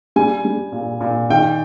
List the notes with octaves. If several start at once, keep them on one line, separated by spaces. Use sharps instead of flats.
G3 G#5
G3
A#2
A#2
D#3 G5